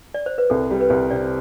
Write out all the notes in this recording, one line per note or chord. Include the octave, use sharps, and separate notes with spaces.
D5
C5
B4
C2 A4
G3
B4
C2
C3 D5